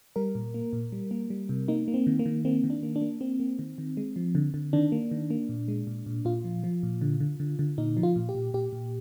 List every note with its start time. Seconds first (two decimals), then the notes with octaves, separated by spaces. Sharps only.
0.16 G3 A#4
0.35 A#2
0.54 A#3
0.73 A#2
0.92 G3
1.11 A#3
1.30 G3
1.49 C3
1.68 A#3 D#4
1.88 A#3
1.94 C4
2.07 D#3
2.19 A#3
2.26 D#3
2.45 A#3 C4
2.64 D#3
2.70 D4
2.83 A#3
2.96 D4
3.01 A#3
3.21 A#3 C4
3.40 A#3
3.59 D#3
3.78 D#3
3.97 G#3
4.16 F3
4.35 D3
4.54 D3
4.73 D#3 D4
4.92 A#3
5.11 D#3
5.30 A#3
5.49 A#2
5.68 G#3
5.87 A#2
6.06 A#2
6.25 A#2 F4
6.44 F3
6.64 F3
6.83 A#2
7.01 D3
7.20 D3
7.40 D3
7.59 D3
7.78 A#2 D#4
7.97 F3
8.03 F4
8.16 A#2
8.29 G4
8.35 A#2
8.54 A#2 G4
8.73 A#2